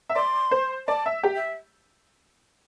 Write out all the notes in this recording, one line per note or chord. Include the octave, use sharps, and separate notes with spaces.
E5
D5 C6
C5
D5 A5
E5
G4
E5